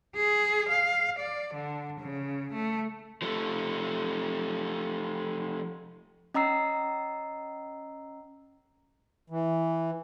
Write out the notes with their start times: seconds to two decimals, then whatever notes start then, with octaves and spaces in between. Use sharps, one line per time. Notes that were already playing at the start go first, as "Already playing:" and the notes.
0.16 G#4
0.69 F5
1.19 D5
1.54 D3
2.00 C#3
2.53 A3
3.22 F3 A3
6.34 C#4 D#5 A#5 E6 C7
9.30 E3